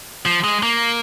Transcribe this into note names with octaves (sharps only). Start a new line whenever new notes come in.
F3
G#3
A#3